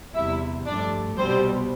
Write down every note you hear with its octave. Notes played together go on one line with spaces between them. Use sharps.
E2 C3 G3 E4 E5
G2 F3 A3 D4 D5
C2 B2 G3 C4 C5